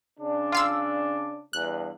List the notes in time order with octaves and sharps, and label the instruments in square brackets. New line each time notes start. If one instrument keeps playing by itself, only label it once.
[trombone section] C#3 D4
[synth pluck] F4 F5 E6
[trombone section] E2 G2 [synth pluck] F#6